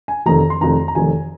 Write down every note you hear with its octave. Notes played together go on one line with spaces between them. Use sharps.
G#5
F1 F2 D#3 A#5
C6
F1 F2 D#3 A#5
A#5
F1 F2 D#3 G#5